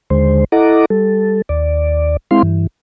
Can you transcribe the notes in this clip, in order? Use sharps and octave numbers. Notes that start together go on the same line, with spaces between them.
D#2 D3 G#3 C5
E4 A4 D#5 F#5 A#5 D6
G3 A4
D#2 D5
G#3 C4 E4 F5 C6
G2 E3